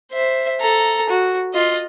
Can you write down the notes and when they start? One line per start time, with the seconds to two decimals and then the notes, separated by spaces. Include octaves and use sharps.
0.12 C5 E5
0.60 A4 A#5
1.09 F#4
1.54 F4 D#5